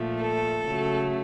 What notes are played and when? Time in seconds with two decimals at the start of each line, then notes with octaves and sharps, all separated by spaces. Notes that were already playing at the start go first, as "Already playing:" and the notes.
Already playing: A#2 F3 A3
0.21 A4
0.63 C#3 F#3 A3